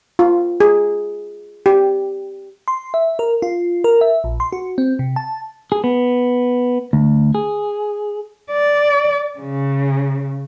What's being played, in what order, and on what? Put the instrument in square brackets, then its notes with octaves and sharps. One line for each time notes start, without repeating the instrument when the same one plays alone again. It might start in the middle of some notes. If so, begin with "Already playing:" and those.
[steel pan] F4
G#4
G4
[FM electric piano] C6
E5
A#4
F4
A#4
E5
A#1
C6
F#4
C4
C3
A5
[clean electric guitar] G#4
B3
D2
G#4
[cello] D5
C#3